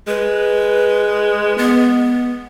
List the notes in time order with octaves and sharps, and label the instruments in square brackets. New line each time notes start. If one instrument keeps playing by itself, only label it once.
[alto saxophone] G#3 [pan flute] B4
[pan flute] B3